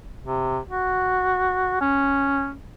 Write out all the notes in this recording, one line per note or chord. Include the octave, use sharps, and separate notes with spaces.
C3
F#4
C#4